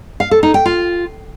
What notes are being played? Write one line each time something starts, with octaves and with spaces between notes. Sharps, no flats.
F5
A4
D#4
G5
F4